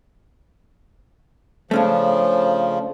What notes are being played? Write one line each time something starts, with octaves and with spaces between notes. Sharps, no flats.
C#3 F3 A3 C#4 D4